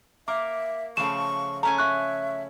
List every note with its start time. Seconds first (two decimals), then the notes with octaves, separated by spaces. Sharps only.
0.28 A#3 A#4 E5 D6
0.97 C#3 F3 A3 C#6 E7
1.63 A3 C#4 G#5 A#5
1.78 E5 C#6 F#6